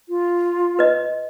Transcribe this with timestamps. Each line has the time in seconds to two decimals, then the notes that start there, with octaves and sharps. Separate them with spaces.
0.09 F4
0.79 B4 D#5